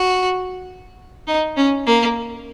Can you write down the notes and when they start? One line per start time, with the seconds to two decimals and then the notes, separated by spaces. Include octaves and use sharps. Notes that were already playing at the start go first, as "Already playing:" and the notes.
Already playing: F#4
1.28 D#4
1.57 C#4
1.87 A#3